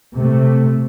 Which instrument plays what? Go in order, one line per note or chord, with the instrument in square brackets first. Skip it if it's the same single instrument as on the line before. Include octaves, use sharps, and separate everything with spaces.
[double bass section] C3 A3